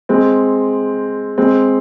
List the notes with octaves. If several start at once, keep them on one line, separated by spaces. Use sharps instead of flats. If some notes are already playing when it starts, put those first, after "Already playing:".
G#3 C4
G#3 C4